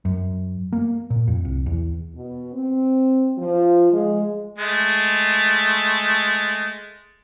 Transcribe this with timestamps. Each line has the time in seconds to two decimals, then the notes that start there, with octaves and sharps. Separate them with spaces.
0.05 F#2
0.72 A#3
1.10 A#2
1.27 F2
1.45 C2
1.66 E2
2.16 B2
2.54 C4
3.38 F3
3.93 G#3
4.58 G#3 A3